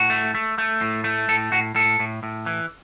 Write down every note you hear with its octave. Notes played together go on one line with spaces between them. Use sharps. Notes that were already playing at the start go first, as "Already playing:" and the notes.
Already playing: A2 F#4
A3
A3
A3
A2
A3
A2 A4
A2 F#4
A2 A4
A2
A2
E3